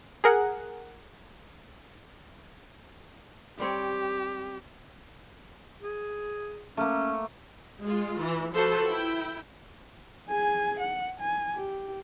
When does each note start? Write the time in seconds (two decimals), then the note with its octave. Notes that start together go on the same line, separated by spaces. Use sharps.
0.24 G#4 A#4 F#5
3.59 G3 C4 G4 C#5
5.82 G#4
6.77 A3 A#3 C#4
7.83 G#3 F4
8.21 E3
8.53 F3 F#4 A4 B4 C5
8.88 E4 G5
10.29 G#4 G#5
10.80 F#5
11.20 G#5
11.56 G4